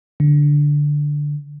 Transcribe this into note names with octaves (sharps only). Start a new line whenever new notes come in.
D3